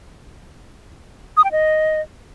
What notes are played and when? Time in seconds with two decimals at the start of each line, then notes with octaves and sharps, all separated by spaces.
1.37 D#6
1.44 G5
1.52 D#5